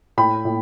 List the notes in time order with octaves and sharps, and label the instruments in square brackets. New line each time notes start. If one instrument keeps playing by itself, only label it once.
[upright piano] A2 G5 B5
A2